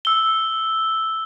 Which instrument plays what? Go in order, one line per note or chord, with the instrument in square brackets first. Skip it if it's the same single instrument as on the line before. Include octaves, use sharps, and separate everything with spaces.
[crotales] E6 G7